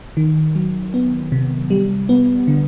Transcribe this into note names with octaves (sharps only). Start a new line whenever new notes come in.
D#3
F#3
B3
C3
G3
B3
D3